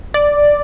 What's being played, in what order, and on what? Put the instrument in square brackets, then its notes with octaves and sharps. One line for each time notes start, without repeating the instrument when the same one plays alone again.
[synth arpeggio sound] D5